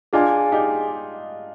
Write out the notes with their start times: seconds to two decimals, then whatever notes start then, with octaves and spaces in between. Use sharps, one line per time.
0.13 D4 F4 G#4 D#5 G#5
0.52 D#4 G4